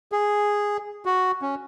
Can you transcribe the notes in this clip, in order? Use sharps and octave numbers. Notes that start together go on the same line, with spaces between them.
G#4
F#4
C#4